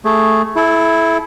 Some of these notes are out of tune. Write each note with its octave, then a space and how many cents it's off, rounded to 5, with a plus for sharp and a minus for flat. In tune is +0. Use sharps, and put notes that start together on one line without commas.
A3 +0 G#4 +0
E4 +0 A4 -35